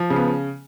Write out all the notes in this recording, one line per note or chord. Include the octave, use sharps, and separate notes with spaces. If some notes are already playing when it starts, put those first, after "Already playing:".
Already playing: F3
C#3
B3